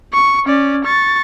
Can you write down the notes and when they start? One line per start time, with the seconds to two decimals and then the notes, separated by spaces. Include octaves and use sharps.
0.13 C#6
0.45 C#4 D5
0.84 C#6 A6